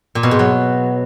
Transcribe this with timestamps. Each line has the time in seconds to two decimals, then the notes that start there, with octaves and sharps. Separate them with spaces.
0.15 A#2
0.23 B2
0.31 G#2
0.39 F#3